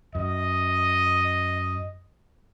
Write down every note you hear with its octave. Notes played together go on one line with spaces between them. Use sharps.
F#2 D#5